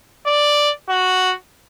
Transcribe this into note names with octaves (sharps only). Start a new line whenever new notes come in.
D5
F#4